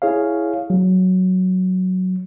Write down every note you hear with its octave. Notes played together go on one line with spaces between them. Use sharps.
E4 G#4 C#5 F5
F#3